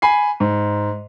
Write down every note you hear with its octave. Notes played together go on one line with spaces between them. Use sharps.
G#5 B5 C7
G#2